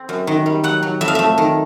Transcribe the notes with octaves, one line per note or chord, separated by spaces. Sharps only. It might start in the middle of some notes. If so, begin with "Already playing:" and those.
Already playing: C4
F#2
D#3
G3
F#3 F#5
F#3
F2 E5
F5
A3 E5
D#3